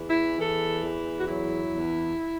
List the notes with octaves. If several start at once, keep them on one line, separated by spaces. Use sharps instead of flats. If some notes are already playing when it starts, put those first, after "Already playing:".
Already playing: E2 E3
E4
E3 A4
E2
F#4
F#3 E4
E2